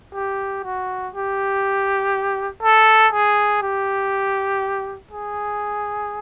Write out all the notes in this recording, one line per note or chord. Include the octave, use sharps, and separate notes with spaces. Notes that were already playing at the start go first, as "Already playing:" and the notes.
G4
F#4
G4
A4
G#4
G4
G#4